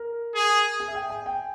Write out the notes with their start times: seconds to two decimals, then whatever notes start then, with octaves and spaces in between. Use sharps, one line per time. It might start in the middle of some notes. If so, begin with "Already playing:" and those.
Already playing: A#4
0.35 G#4
0.80 G#4
0.88 E5
0.95 G5
1.10 G#5
1.26 G5